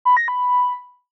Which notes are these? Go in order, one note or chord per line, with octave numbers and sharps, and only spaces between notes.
B5
A#6
B5